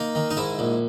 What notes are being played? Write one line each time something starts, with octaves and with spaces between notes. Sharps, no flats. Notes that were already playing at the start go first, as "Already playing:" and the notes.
Already playing: A#3 D#4
D#3
D#4
G#2 E4
A#1